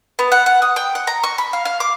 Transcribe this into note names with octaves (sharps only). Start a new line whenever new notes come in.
B3
F#5
F#5
D#6
G5
F#5
A#5
C#6
B5
F5
F5
D6